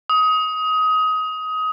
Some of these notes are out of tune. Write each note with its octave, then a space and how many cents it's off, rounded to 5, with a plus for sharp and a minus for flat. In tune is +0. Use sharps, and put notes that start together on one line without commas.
D#6 +20